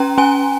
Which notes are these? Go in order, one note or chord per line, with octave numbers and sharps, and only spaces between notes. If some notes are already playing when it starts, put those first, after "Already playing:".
Already playing: C#4 G5 A#5
C#4 G#5